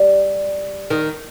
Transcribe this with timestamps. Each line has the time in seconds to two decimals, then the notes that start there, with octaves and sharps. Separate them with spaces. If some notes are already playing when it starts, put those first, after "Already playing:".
Already playing: G3
0.90 D#3